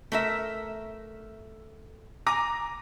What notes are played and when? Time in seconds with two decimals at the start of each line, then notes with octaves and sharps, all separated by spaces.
0.12 A3 A#4 E5
2.27 G#5 A#5 D6 A#6